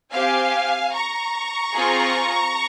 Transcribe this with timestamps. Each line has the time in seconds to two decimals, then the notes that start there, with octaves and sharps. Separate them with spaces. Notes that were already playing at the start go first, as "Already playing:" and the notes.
0.13 C4 G4 F5 G#5
0.93 A#5 C#6
1.74 C4 F4 G#4